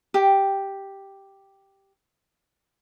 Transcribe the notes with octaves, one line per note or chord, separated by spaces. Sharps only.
G4 G5